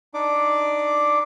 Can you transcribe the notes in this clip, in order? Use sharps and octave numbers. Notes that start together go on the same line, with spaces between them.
D4 D#4 D5 D6